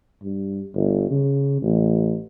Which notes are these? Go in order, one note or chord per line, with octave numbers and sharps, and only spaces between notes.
G2
G1
C#3
A1